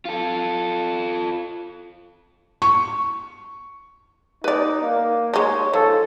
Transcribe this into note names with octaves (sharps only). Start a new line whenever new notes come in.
F4 A4
C#6
D#4 B4 D5
A#3
G#3 D#4 C#5
D#3 F3 A4